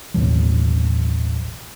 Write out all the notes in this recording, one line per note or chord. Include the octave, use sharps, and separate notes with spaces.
A1 D#2 B2 F#3